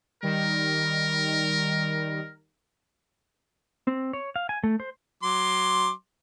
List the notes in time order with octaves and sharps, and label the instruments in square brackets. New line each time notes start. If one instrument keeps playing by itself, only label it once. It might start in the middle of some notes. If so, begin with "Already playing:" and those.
[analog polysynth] D#3 G3 [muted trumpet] A#4
[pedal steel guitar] C4
C#5
F5
G#5
A3
C5
[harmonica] F#3 C6 D6